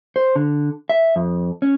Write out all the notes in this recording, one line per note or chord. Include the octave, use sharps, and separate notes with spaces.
C5
D3
E5
F2
C#4